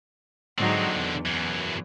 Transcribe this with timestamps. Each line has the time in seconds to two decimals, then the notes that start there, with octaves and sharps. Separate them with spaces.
0.58 G#2 D3 F#3 C4 D#4
0.93 E2
1.26 F#2 E3